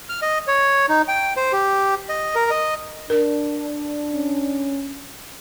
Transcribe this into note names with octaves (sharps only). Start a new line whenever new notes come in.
F6
D#5
C#5
D#4
G5
C5
G4
D#5
A#4
D#5
D4 A#4
C#4